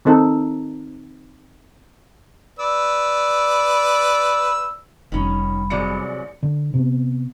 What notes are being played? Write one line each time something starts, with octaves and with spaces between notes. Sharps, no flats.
D#3 C4 D#4 A4
B4 D5 E6
F1 D#3 G3 C#4 B5
A1 C3 F#3 G#3 D5 C#7
D3
C3 B3